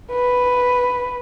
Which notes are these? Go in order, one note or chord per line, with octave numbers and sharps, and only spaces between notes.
B4